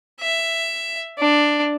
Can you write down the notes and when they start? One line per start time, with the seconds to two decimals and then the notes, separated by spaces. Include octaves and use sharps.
0.21 E5
1.19 D4